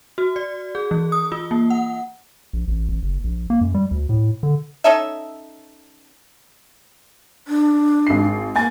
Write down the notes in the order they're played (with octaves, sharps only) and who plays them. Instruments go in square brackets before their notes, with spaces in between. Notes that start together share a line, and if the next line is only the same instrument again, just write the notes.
[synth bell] F#4
D5
G#4
E3
D#6
F4
A#3
F#5
[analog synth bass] A#1
A1
A1
F#1
A#1
A#3
F#2
G3
D2
A2
D3
[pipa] C#4 D#4 A4 E5
[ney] D4
[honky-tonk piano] G#1 C7
[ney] A#3 [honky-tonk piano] G#5 A6